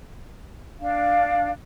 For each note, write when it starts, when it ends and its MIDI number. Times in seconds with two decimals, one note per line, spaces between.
0.80 1.48 62
0.80 1.48 77